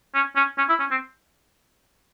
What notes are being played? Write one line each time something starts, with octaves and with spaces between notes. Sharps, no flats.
C#4
C#4
C#4
E4
C#4
C4